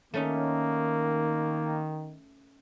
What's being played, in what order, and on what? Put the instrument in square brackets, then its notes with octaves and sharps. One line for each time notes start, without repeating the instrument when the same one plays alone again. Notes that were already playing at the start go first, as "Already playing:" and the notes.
[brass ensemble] D#3 [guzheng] A3 C#4 D#4 [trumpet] A#3